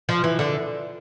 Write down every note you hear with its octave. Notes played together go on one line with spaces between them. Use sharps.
F3
E3
D3